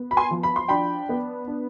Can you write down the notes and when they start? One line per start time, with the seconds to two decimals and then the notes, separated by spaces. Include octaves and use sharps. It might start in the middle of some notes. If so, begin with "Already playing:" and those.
Already playing: B3
0.11 B5
0.17 G#5 C6
0.31 F3
0.43 B5
0.56 C6
0.68 D4 G5 B5
1.09 B3
1.47 D4